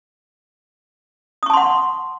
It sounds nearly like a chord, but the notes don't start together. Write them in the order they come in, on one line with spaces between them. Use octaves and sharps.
D#6 C#6 A5 C6 F#5